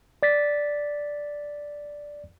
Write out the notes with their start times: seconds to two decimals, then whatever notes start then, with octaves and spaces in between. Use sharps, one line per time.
0.23 D5 A6 B6